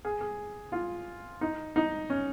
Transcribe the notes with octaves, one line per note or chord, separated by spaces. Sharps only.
G#4
G#4
F4
D#4
D#4
C#4